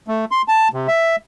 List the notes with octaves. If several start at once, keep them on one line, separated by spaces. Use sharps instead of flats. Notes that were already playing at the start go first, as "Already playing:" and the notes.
A3
C6
A5
C3
E5